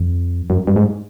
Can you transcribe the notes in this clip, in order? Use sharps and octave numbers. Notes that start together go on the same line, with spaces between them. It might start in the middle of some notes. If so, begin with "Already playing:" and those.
Already playing: F2
F#2
G2
G#2